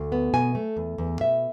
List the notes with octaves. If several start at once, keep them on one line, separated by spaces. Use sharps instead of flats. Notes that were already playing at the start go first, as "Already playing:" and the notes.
Already playing: D2
B3
B2 G#5
A3
E2
E2
B2 E5